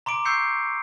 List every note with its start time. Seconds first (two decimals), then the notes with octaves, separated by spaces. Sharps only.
0.06 A#5 C6 D6 D7
0.25 C#6 E6 G6 C7 C#7